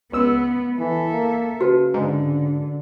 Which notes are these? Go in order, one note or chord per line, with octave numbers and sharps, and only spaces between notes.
C#2 B3 E6
E3 A4 E5
A#3
C#3 F#4 B4 A5
G#2 D3